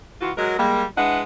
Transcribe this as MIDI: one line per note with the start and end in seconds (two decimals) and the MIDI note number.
0.21 0.31 52
0.21 0.31 65
0.21 0.31 66
0.37 0.55 54
0.37 0.55 56
0.37 0.55 70
0.58 0.84 55
0.58 0.84 56
0.58 0.84 58
0.97 1.22 56
0.97 1.22 62
0.97 1.22 64
0.97 1.22 71
0.97 1.22 75
0.97 1.22 78